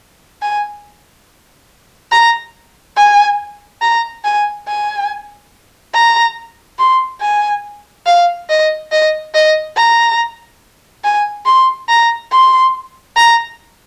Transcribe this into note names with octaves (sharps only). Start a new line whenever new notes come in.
G#5
A#5
G#5
A#5
G#5
G#5
A#5
C6
G#5
F5
D#5
D#5
D#5
A#5
G#5
C6
A#5
C6
A#5